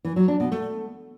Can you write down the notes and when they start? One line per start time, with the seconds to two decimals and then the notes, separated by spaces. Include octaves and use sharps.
0.05 E3
0.16 F#3
0.28 D4
0.40 B2
0.52 A3